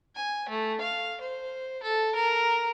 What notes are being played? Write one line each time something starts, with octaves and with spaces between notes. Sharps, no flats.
G#5
A3
F5
C5
A4
A#4